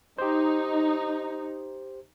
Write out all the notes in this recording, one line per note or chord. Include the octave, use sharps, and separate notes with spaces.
D#4 G4 C5